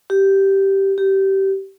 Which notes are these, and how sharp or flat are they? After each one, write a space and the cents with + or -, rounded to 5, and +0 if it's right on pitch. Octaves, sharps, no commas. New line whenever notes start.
G4 -10
G4 -20